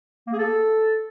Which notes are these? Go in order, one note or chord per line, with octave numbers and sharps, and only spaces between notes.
A#3
G#4
A4